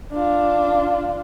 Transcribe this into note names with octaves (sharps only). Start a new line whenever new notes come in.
D4 F4